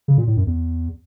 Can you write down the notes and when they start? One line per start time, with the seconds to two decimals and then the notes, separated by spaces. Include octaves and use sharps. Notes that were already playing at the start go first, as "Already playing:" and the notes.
0.08 C#3
0.18 A#2
0.27 A2
0.37 F#2
0.47 E2